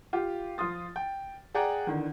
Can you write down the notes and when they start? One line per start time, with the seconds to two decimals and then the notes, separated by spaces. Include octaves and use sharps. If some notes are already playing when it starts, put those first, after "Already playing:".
0.13 F4 G4
0.58 F3 F4 C6 D#6 A6
0.96 G5
1.55 G#4 D5 F#5 G5 A#5
1.87 E2 D3 D#3